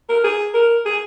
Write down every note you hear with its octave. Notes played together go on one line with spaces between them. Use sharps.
A#4
G#4
A#4
G#4